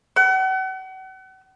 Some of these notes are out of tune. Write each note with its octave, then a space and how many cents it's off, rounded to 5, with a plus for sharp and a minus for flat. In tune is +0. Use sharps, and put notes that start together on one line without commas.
F#5 +40